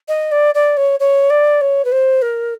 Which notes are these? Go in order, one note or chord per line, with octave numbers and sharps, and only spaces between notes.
D#5
D5
D5
C#5
C#5
D5
C#5
B4
C5
A#4